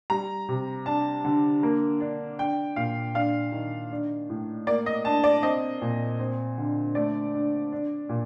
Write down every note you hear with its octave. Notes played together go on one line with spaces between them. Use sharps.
G3 A#5
C3
D4 A5
D3
A#3
D4
D4 G5
A#2 F5
D4 F5
D#3
D4
A2
A#3 D5
D#5
D4 A5
D5
C4 D#5
A#2
C4
D3
A3 D5
D4
D4
A#2